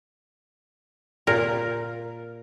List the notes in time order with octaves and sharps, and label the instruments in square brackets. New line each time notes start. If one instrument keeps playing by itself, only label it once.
[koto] A#2 A#4